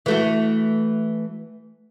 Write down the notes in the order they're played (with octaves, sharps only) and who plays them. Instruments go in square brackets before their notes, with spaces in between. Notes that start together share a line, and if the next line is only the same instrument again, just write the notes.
[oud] E3 A3 F#4